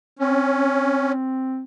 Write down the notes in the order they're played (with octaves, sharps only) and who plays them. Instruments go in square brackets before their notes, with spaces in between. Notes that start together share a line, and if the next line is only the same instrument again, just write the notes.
[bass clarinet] C4 [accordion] C#4